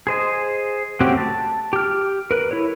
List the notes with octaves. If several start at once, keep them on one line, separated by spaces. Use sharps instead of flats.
G#4 C5 D#5
A3 C4 C#4 F#4 G4
A5
G4 F6
A#4 B4
E4 A4 C#5